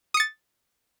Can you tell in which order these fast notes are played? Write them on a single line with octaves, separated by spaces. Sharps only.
D#6 C#7 A6